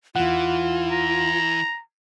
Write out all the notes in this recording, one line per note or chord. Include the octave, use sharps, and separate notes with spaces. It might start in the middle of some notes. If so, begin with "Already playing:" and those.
E2 E3 F4 F#5
A#5